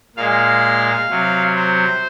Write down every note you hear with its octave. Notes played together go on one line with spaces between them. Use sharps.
A#2 G#3 F5
C3 F#3
C5